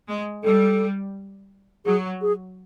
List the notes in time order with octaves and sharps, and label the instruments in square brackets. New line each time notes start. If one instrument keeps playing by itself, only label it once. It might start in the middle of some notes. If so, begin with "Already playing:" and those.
[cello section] G#3
[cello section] G3 [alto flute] A4
[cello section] F#3 [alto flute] G#4
[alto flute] G#4